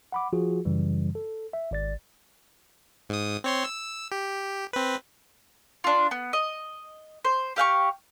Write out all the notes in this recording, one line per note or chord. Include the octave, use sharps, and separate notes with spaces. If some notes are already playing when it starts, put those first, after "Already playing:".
F#5 B5 D6
F3 F4 F#4 G#4
F#2 C#3 E3 G3
A4
E5
G#1 D5 A6
G#2 D#6
C4 C#5 C6
E6
G4
C4 B4
D4 F4
B3
D#5
C5
G4 F5 G5 C#6